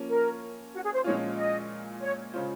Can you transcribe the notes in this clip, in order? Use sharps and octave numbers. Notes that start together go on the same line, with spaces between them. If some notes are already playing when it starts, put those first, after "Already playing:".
Already playing: F3 A#3 C#4
A#4
F#4
G#4
C5
A#2 F3 G#3 C#4 F4 C#5
D#5
C#5
C#3 G#3 C#4 F4 C5